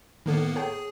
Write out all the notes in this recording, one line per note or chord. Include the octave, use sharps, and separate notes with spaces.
A2 D#3 A#3 B3 A4
G#4 A4 C#5 G5